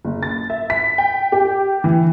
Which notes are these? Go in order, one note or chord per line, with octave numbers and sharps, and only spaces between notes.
F#1
A6
E5
B6
G5
G4
E3